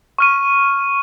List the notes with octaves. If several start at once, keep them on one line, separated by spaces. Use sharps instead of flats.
C#6 F6 D#7